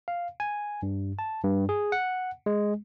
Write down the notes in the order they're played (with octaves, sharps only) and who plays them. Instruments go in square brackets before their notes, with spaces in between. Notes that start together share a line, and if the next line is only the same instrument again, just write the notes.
[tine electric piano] F5
G#5
G2
A5
G2
G#4
F#5
G#3